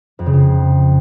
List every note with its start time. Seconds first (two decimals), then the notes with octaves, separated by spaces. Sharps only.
0.19 F2
0.26 C#3
0.33 F2